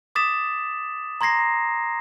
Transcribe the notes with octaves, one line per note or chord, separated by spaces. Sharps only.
D6 D#6 A6 B6 E7
A#5 C6 G#6 A#6 C7